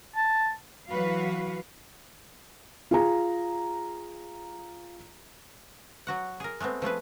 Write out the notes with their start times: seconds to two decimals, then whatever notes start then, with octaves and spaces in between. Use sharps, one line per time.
0.15 A5
0.88 E3 F#3 F#4 B4 F5
2.91 F4 G#4 A#5
6.07 F#3 F#4 F#5
6.40 G#4 A#4
6.60 G#3 A3 B3 C4
6.82 F3 A3 G#4 B4